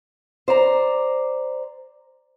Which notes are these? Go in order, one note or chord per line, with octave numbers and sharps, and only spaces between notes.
C5 D5 A#5